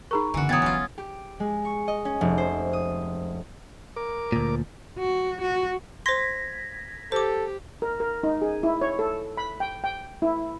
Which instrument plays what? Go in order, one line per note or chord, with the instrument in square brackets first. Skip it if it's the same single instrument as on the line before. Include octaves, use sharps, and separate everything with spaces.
[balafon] D#4 G#4 A#4 [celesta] A#5 C#6
[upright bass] F#1 D3 [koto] E3 F#4
[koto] E3 F#3 [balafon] B3 [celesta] D#6 G#6 A6
[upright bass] G1 F#3 [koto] C#4 F4
[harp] G4
G#3
C#6
D#5
C#4
F1
C5
D#6
[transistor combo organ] A#4 D6
[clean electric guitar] D2 A#2
[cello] F#4
F#4
[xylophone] C5 C6 [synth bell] G#6 A#6 B6
[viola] G4 [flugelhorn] A4 [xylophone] C5 D6
[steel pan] A#4
A#4
D#4
G#4
E4
C#5
A4
B5
G5
G5
E4